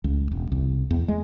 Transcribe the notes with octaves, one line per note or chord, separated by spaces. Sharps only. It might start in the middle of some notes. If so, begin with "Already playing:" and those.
C#2
E1
C2
E2
G#3